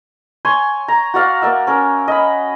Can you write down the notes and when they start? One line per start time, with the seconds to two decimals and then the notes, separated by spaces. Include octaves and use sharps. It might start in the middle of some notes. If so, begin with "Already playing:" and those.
0.45 C#5 G#5 C6
0.88 A#5
1.14 F#4 D5 F5 F#5
1.42 A#3 D5 E5
1.67 C#4 A#4
2.08 D#5 B5